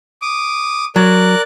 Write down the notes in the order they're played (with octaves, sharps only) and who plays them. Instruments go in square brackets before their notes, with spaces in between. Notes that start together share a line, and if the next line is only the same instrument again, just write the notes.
[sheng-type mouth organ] D6 D#6
[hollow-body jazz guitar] F#3 [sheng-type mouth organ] A#4 D5 F#6